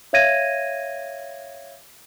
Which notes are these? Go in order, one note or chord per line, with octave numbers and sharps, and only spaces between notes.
C#5 E5 F5 G#6 A#6 D#7